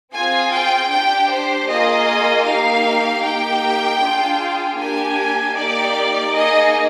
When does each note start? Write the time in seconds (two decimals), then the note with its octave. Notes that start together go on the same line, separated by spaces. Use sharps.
0.13 C4 F4 G#4 G#5
0.52 G5
0.90 D4 G4 G5
1.30 C5
1.68 A#3 F4 G#4 D#5
2.45 A#3 D#4 G4 F5
3.23 A#3 D#4 G4 G5
4.00 D4 F4 G#4
4.78 A#3 D4 G4 G#5
5.55 A#3 D#4 G4 D5
6.32 A#3 D#4 G#4 D#5